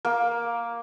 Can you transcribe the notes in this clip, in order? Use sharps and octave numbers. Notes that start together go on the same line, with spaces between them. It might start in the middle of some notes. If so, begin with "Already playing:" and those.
A#3